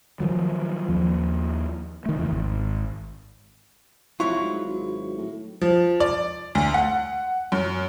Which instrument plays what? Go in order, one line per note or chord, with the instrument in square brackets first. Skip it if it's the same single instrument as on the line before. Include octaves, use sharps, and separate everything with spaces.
[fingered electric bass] D#3 F3 F#3
D#2 F3
D#3 A3
E2 C#3
G#1
[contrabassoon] F1 [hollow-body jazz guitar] F#3 E4 F4 [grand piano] C#6
[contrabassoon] G#2
G#1
A2
[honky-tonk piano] F3
D5
D2
F#5
F#2